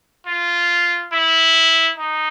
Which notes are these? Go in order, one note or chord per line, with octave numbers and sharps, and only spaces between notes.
F4
E4
D#4